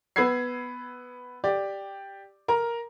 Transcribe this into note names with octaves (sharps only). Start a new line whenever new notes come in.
B3 B5 E6 G#6 C7
G4 D5
A#4 A#5